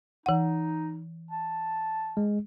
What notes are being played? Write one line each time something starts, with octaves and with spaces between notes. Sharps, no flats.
E3 D#4 F#5
A5
G#3